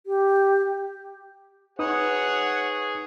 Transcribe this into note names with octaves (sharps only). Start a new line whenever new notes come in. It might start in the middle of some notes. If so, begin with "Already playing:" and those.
G4
D#4 G#4 B4 C#5 F#5 D#6